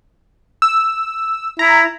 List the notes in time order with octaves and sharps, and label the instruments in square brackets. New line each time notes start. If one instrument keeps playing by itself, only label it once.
[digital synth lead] E6
[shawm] E4 [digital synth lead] A#5